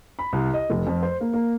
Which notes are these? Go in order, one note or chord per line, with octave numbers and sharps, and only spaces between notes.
B5
C2
D#5
F1
F2
C5
A#3
A#3